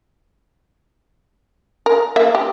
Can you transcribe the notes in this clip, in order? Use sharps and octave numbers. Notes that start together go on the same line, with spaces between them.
A#4
A#3 E5
G4